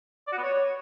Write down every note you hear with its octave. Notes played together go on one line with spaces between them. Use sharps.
D5
F#4
B3
C#5